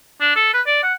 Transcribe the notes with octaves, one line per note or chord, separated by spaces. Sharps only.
D4
A4
B4
D5
F#5